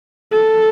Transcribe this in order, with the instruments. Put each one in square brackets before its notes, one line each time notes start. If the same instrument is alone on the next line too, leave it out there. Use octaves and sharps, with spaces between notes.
[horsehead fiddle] A4